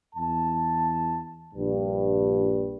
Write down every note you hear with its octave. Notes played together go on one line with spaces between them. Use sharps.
E2 A5
A#1 G2